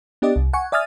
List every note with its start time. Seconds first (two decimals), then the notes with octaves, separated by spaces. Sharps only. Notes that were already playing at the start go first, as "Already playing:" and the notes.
0.22 B3 D4 G4 D5 D#5
0.36 C2
0.53 F#5 G#5 C#6
0.72 D5 E5 G#5 D#6 F6 A6